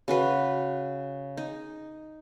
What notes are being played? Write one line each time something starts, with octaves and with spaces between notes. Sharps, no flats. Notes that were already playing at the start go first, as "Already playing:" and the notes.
C#3 F#4 B4
D#4